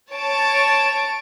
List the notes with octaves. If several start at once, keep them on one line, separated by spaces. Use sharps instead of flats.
C#5 A5 D7